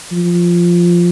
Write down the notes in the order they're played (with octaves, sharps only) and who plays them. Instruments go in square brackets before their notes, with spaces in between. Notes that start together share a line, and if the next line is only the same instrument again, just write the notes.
[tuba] F3